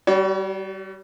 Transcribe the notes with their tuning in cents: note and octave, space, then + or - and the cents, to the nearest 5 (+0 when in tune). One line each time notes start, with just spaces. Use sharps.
G3 -15 F#4 +40 C#5 +40